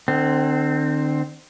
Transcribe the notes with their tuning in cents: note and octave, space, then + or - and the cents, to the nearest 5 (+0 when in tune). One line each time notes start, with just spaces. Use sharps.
D3 +40 C4 +0